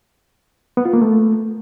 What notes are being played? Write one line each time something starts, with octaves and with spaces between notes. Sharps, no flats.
B3
F4
A#3
A3